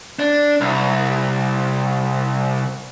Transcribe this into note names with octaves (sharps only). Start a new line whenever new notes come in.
D4
C2